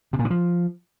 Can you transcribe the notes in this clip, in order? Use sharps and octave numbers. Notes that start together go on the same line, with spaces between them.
C3
A#2
D3
F3